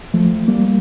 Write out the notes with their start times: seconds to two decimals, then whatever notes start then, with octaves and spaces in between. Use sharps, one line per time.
0.14 F3 A3
0.48 G3 A#3